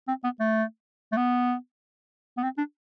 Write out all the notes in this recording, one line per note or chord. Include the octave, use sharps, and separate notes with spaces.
C4
B3
A3
A3
B3
B3
C4
D4